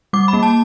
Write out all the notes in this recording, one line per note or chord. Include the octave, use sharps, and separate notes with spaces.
G3 D6
B5
A#3
A5